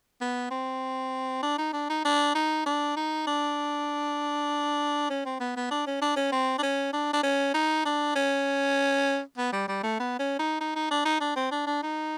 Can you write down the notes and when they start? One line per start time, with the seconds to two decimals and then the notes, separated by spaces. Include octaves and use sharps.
0.21 B3
0.51 C4
1.43 D4
1.58 D#4
1.73 D4
1.90 D#4
2.05 D4
2.35 D#4
2.66 D4
2.97 D#4
3.27 D4
5.10 C#4
5.25 C4
5.40 B3
5.57 B3
5.71 D4
5.87 C#4
6.02 D4
6.16 C#4
6.32 C4
6.59 D4
6.63 C#4
6.93 D4
7.13 D4
7.23 C#4
7.54 D#4
7.86 D4
8.15 C#4
9.38 B3
9.53 G3
9.69 G3
9.83 A3
10.00 B3
10.19 C#4
10.39 D#4
10.61 D#4
10.76 D#4
10.91 D4
11.06 D#4
11.21 D4
11.36 C4
11.52 D4
11.67 D4
11.83 D#4